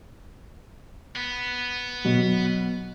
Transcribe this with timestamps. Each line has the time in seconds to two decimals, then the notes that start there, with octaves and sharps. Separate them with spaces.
1.16 B3
2.05 B2 F#3